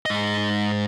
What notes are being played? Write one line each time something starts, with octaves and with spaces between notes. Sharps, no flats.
G#2 D#5